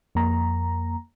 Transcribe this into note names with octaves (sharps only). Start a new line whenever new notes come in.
F2 A#3 A#5